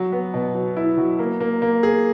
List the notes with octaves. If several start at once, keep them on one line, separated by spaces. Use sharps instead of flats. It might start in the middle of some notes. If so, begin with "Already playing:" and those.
Already playing: F#3
B3
B2
F#3
E4
F#3
A#3
A#3
A#3
G#4